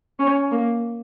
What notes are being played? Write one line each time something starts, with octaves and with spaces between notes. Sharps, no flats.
C#4
A#3